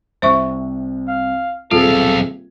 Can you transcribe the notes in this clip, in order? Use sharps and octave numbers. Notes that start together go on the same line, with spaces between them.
C2 C3 C5 E5 C#6
F5
D#1 B1 C3 F4 G#4 A4 F5